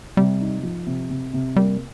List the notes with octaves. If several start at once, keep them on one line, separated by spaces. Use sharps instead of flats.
C3 G3
D#4
F3
C3
C3
C3
G3 A#3